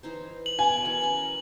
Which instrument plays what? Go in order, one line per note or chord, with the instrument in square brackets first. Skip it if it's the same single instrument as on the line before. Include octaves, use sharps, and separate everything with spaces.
[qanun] E3 D#4 C5
[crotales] F#7
[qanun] B2 D6 [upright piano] G#5
[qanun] E3 A#4 B4
C#4 A#4